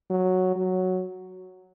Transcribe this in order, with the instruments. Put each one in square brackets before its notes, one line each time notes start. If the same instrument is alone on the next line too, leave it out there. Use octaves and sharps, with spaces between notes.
[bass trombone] F#3
F#3